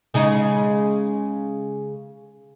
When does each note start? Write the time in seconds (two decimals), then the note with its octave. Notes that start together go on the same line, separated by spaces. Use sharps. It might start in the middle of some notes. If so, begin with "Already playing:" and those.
0.14 C#3 G#3 D#4